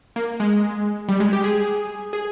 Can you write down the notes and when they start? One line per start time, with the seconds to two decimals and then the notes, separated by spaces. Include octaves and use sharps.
0.16 A#3
0.40 G#3
1.09 G3
1.20 G#3
1.33 G4
1.44 G#4
2.13 G#4